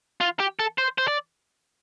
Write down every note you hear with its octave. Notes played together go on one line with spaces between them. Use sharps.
F4
G4
A4
C5
C5
D5